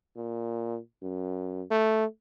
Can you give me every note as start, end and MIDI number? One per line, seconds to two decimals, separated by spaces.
0.16 0.78 46
1.02 1.63 42
1.71 2.05 57